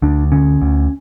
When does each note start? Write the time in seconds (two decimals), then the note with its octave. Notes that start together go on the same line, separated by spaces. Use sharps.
0.02 D2 D4
0.32 D3 C#4
0.61 D2